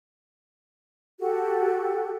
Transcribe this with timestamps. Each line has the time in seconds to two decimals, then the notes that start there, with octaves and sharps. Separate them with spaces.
1.20 F#4 G4 A4